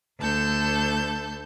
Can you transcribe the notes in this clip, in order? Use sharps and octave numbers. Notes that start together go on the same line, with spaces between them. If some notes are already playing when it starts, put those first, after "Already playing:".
D2 A4 G6